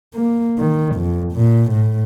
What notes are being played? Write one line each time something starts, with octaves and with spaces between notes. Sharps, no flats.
A#3
D#3
F2
A#2
A2